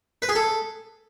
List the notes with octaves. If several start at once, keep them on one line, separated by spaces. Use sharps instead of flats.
B4
G#4
A4